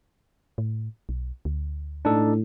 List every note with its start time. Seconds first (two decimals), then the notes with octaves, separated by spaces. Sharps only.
0.58 A2
1.09 B1
1.45 D2
2.05 A2 D4 D#4 A4